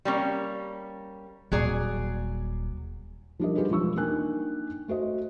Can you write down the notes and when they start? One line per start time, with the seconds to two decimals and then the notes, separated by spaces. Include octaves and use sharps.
0.05 G3 A#3 C#4
1.52 D#1 F#3 G#4 D5
3.40 F3 G3 D4 G4 A#4 D#5
3.56 G3 D4 F4 G4 G#4 B4
3.70 E1 F3 G3 C#6 E6
3.96 A#3 D4 D#4 G5 G#5 F#6
4.88 A3 F#4 C5 D#5